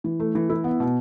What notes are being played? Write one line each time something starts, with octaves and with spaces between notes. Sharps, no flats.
E3
A3
E3
E4
B3
B2